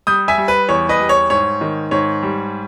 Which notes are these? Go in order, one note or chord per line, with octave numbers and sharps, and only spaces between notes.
G3 D#6 G6
E5 G#5
G3
B4
E2 C#5
B4 D#5
G3
C#5
G#2 C#5
D#3
G#2 C#5
G3